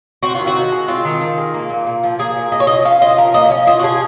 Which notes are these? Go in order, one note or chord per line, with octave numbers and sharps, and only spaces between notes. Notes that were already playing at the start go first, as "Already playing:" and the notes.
C4 F#4
D#3 F4
F#4
D#3
G#3
C4 F4
D#3
D#3
G#3
A#3
A#2
A#2
F3
A#3 G#4
A#2
A#2 D#5
C#5
F3 D#5
C#4 F5
F4 D#5
F3 A#4
A#3 D#5
C#4 D#5
F4 D#5
F#4
F3 G#4